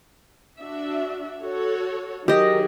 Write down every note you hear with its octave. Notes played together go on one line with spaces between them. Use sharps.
D4 F#4 E5
F#4 A4 C#5
D#3 F#3 G4 G#4 D#5